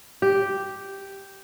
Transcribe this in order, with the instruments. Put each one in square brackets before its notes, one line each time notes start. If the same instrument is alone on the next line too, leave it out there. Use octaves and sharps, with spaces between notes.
[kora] G4